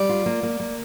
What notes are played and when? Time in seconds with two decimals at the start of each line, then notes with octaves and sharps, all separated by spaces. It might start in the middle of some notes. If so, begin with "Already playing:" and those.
Already playing: G3 D5
0.09 F4
0.26 A#3
0.43 A#3
0.60 A#3